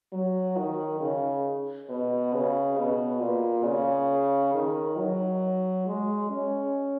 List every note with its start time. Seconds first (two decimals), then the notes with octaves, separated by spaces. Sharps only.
0.13 F#3
0.57 D#3
1.00 C#3
1.90 B2
2.34 C#3
2.78 B2
3.21 A#2
3.65 C#3
4.54 D#3
4.98 F#3
5.86 G#3
6.30 C#4